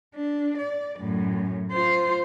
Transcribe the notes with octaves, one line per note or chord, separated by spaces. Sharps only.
D4
D5
F#2 A2
F4 C5